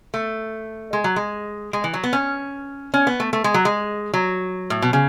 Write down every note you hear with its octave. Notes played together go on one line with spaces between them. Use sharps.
A3
G#3
F#3
G#3
G#3
E3
F#3
B3
C#4
C#4
B3
A3
A3
G#3
F#3
G#3
F#3
A2
B2
C#3